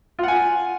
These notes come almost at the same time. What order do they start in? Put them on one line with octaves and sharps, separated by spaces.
F4 F#5 G#5